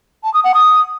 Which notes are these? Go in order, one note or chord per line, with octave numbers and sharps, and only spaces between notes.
A5
D#6
F#5
D#6